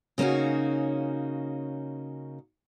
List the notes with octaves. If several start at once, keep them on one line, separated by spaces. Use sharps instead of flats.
C#3 A#3 C#4 D#4 F#4